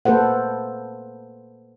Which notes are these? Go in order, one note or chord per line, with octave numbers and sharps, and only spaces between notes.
A#3 A4 B4 C5 F#5